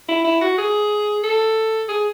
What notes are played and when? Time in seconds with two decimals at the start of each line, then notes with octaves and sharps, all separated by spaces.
0.08 E4
0.25 E4
0.41 F#4
0.58 G#4
1.24 A4
1.89 G#4